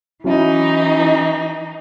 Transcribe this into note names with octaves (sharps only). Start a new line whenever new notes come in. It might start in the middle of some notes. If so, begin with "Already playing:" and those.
E3 F#3 C#4 D#4 E4